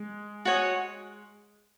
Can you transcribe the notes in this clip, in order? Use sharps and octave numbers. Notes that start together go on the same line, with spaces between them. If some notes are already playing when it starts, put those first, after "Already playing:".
Already playing: G#3
F#4 C#5 G#5 D#6